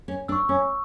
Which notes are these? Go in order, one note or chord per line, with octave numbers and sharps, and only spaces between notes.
C#4
D4 C#6 E6
C#4